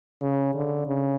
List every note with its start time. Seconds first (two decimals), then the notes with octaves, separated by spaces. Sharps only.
0.22 C#3
0.54 D3
0.87 C#3